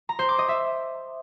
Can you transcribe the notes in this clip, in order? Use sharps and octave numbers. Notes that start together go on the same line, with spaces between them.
A#5
C5
D6
D#5
E5